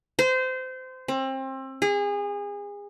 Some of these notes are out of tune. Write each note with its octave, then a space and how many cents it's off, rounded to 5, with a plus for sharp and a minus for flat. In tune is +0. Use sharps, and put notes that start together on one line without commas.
C5 -25
C4 +30
G#4 -30